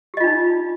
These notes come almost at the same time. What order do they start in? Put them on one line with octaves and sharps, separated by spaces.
G4 D#5 F4 D4 D#4